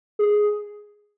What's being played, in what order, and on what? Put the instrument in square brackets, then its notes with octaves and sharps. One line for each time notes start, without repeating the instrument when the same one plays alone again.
[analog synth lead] G#4